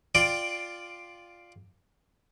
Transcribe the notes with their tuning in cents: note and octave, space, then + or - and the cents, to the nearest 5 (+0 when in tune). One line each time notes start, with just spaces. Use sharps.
F4 +0 D5 +10 G5 +0